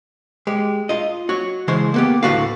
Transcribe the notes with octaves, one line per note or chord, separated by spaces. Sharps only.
G#3 G4
F4 D#5
F#4 C#5
C#3 E3 G#3 C5 C#5
A#3 B3 G4
D2 A2 F3 F#4 B4 F5